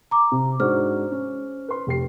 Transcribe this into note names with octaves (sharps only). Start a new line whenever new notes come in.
A#5 D6
C3
G#2 D4 F#4 C5 F6
C#4
B4 C6
F1 G4 C7